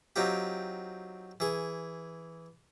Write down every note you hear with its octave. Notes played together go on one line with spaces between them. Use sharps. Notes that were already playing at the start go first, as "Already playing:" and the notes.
F#3 C4 D#4 F4 G4
E3 G#4